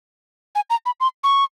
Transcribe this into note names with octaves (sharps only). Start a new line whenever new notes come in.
G#5
A#5
B5
C6
C#6